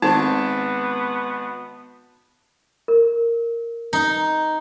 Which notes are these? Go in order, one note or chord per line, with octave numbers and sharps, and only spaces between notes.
G#1 B3 C4 D#4 A5
A#4
D#4